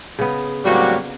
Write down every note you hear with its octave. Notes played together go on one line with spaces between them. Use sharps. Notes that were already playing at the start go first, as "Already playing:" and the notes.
C#3 B3
A2 F#3 G3 A#3 C4 F#4